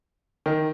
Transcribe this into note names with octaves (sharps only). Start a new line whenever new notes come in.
D#3